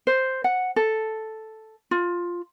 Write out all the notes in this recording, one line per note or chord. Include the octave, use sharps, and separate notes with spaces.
C5
F#5
A4
F4